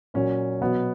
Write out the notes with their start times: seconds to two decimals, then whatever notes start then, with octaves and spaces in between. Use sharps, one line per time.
0.14 A#2 F#3 C#4
0.60 B2 F#3 B3